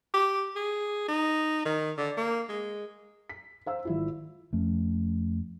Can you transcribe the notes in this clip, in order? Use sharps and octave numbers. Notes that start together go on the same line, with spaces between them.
G4
G#4
D#4
D#3
D3
A#3
G#3
B6
C5 F5 E6
G#1 E4 F4
F2 F3 A3 C#4